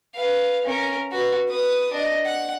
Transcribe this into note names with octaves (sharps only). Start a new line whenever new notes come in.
B4 F5
C#4 A#4
F#4 B4
B4 D#6
D4 D#5
F#5